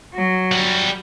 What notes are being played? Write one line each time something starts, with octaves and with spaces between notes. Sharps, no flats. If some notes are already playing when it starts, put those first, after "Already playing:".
F#3
G3 F#5